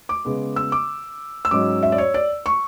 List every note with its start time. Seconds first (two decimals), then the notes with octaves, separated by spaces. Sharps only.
0.09 D6
0.25 C#3 G#3 B3
0.56 E6
0.72 D6
1.45 E6
1.51 G#2 F#3 C#4 D6
1.83 E5
1.92 D5
1.98 C#5
2.14 D5
2.46 C#6